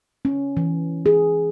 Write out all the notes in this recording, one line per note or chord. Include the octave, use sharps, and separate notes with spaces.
C#4
E3
G#4